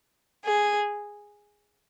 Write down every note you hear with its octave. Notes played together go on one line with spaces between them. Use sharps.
G#4